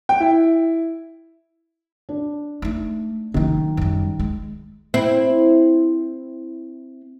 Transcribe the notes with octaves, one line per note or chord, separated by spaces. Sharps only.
G5
E4
D4
A3 D#4
D#3 F#3 D#4
F#2 G3
G#3
C4 E4